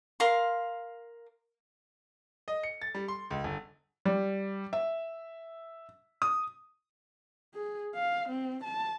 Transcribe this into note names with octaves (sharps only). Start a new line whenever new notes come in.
A#4 F5 C6
D#5
C#7
A6
G3
C6
C#2
G1
G3
E5
D#6
G#4
F5
C4
A5